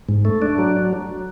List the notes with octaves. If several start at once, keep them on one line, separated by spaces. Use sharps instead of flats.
G#2
A3
D4
F#3